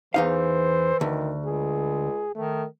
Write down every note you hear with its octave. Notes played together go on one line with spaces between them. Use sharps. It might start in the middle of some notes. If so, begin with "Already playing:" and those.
E2 E3 D#4 C5 F5
D2 D#3
C#2 G#4
D#3 A3